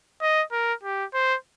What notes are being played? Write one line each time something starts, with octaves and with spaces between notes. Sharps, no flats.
D#5
A#4
G4
C5